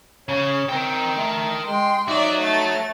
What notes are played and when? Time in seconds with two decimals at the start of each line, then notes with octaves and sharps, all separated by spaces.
0.29 C#3 C#5
0.69 C4 A#4 G5
1.17 A3
1.66 G#3 G5 C6
2.08 D#4 F#4 C#5 D5 E5
2.41 A3 A6